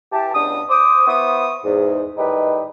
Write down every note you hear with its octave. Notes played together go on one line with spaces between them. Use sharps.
E3 G4 A5
C#2 B3 D4 D#6
C5 D6 D#6
B3 E4 C5 C#6 D#6
E2 G#2
A2 D#3 G3 D#4 G4 B4